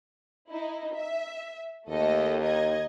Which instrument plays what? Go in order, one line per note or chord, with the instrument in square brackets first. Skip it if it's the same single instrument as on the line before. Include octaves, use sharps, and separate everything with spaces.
[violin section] D#4 E4
E5
[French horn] D#2 [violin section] A3 A4 D#5
[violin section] D#4 D#5 G#6